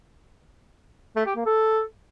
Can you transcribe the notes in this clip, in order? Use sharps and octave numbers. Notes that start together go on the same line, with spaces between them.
A3
G4
A#3
A4